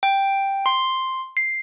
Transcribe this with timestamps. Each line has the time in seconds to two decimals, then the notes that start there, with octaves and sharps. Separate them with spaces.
0.03 G5
0.66 C6
1.37 C7